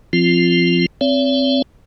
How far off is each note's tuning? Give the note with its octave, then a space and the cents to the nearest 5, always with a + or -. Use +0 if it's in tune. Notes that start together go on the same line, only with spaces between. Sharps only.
F3 +0 C4 +0 F4 -15
C4 +0 C#5 +45 E5 +40